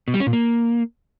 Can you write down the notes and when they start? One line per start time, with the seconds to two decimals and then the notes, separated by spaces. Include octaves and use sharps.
0.08 B2
0.14 G3
0.20 C#4
0.27 A#2
0.33 A#3